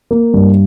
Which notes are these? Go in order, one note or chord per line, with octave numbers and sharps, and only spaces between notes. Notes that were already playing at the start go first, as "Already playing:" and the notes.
A#3
G2